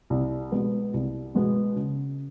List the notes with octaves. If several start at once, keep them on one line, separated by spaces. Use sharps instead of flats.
C2
B2 G#3 B3
C2
B2 G#3 B3
C#3